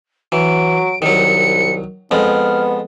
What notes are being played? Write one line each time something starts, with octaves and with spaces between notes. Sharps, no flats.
E3 F#3 D7
C2 D#3 F#3 C#7
F2 G#3 B3 F6